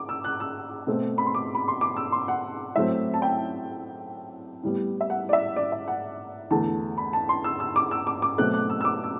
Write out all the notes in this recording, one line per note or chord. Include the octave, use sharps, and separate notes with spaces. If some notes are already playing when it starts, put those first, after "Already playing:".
Already playing: D6
E6
F#6
E6
B2 A3 C4
B5
C6
D6
B5
C6
D6
E6
C6
F#5
A2 F#3 A3 C4 E5
A5
G5
A2 G3 B3
E5
F#5
D5
E5
D5
E5
F#5
E2 D3 A3 A5
B5
A5
C6
E6
E6
D6
E6
D6
D6
B2 F#3 A3 C4 F#6
F#6
E6
E6
D6
E6